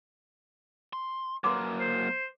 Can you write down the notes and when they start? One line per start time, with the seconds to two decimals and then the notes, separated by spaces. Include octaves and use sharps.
0.93 C6
1.44 F#3 A#3 B4 C6 D6
1.80 C5